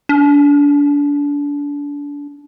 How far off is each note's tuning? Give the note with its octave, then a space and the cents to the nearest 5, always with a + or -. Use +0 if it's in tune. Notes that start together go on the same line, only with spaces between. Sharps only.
D4 -30